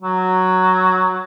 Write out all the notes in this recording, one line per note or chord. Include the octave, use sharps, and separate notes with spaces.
F#3